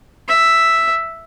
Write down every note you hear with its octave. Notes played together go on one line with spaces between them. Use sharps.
E5